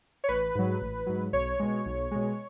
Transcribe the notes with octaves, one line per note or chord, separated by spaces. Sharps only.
C#5
A1 B4
G#2 F#3
A1
G#2 F#3
B1 C#5
B2 G#3
B1
B2 G#3